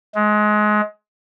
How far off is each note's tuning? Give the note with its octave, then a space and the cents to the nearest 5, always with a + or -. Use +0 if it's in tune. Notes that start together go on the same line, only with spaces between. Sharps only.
G#3 +25